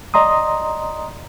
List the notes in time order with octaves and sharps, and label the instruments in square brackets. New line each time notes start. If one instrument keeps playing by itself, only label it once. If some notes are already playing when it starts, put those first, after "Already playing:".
[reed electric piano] D5 D#5 A#5 C6 D#6